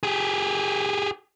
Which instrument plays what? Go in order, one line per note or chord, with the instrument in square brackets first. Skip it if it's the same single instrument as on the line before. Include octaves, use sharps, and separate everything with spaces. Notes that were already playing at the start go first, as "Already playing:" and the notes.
[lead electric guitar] G4 G#4